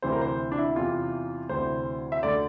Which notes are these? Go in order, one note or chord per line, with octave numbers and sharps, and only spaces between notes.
D2 C3 E3 C5
A#4
C5
D4
E4
E2 C3 E3 F4
D2 C3 E3 C5
E5
D2 D3 D5